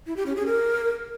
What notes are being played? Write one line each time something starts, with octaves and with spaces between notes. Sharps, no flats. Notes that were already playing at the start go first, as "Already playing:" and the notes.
E4
G4
C#4
G#4
A#4